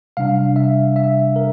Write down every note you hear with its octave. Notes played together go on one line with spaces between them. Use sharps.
C3 G3 D4 F5
E5
E5
A#4